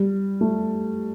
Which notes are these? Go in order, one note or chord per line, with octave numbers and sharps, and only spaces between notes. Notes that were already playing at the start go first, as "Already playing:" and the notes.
Already playing: G3
A3